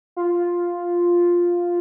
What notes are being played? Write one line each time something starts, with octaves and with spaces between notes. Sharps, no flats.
F4